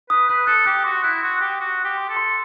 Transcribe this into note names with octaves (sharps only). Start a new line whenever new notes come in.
B4 D#6
B4 F#6
A4 F#6
G4 F#6
F#4 C6
E4 F#6
F#4 C6
G4 C6
F#4 F#6
D#6
G4
C6
A4
C6